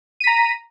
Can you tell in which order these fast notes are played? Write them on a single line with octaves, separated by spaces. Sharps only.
D#7 B6 A#5